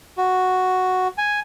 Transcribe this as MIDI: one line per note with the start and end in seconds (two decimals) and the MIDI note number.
0.18 1.08 66
1.18 1.40 80